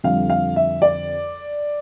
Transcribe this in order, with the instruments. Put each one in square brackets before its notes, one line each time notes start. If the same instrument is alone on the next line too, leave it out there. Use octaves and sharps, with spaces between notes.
[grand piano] F2 D3 G3 F5
F5
E5
D5